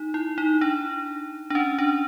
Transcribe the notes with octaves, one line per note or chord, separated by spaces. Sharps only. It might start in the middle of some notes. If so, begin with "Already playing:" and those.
Already playing: D#4
E4
D#4
D4
D4
C#4
D4